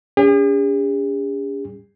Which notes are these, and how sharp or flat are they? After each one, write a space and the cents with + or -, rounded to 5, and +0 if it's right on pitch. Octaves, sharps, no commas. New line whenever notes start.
C#4 +40 G#4 -45